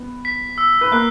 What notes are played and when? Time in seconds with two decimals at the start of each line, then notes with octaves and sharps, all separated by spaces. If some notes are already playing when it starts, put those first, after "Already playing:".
Already playing: B3
0.25 B6
0.58 E6
0.81 B4
0.92 A#3 A#4 F#6